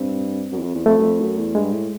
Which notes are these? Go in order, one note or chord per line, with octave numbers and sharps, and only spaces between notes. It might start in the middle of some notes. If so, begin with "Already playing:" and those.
Already playing: G2 C4
F#2
E2
F2
E2
F2 A3
F#2
F2
F#2
E2
G2 G#3
A2